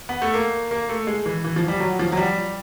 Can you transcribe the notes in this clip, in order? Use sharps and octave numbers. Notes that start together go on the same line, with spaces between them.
B3
A3
A#3
A#3
A3
G#3
E3
E3
F3
G3
F#3
F3
F#3
G3